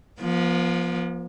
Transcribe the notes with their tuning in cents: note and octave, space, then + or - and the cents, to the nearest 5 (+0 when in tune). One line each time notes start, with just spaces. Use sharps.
F3 +0 B3 -45